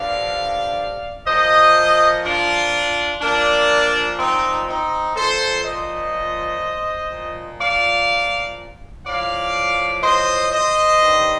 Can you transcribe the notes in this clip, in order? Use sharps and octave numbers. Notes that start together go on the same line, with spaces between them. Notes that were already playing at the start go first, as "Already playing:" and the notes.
Already playing: G2 D3 F3 D5 F5
A#2 F3 C5 D#5
D4 F4
A#2 F3 A#3 D4
C4 D#4
C4 D#4
A#2 F3 A4 C5
C5 D#5
A#2 F3
D5 F5
A2 F3 D5 F5
C5 D#5
C5 D#5
G2 D#3